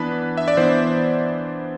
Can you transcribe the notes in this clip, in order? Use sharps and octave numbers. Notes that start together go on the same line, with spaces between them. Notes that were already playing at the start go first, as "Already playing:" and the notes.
Already playing: E3 B3 D4 B4
E5
D5
E3 B3 D4 C5